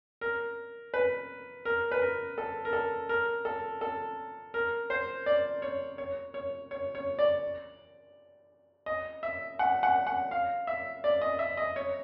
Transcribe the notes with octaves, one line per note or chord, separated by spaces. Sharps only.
A#4
B4
A#4
B4
A#4
A4
A#4
A4
A#4
A4
A4
A#4
C5
D5
C#5
C#5
C#5
C#5
C#5
D5
D#5
E5
F#5
F#5
F#5
F5
E5
D5
D#5
E5
D#5
C#5